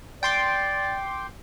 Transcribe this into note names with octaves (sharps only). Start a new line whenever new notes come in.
D5 G5 C6 D6